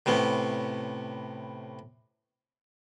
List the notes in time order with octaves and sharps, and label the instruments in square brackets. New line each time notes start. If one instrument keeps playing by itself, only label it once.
[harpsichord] A2 C3 B3 C#4